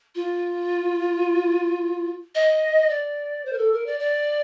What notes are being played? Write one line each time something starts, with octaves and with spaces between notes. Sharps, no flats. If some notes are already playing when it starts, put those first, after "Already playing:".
F4
D#5
D5
C5
A#4
A4
A#4
D5
D5